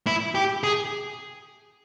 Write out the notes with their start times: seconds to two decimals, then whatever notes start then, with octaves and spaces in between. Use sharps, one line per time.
0.07 E4
0.35 G4
0.64 G#4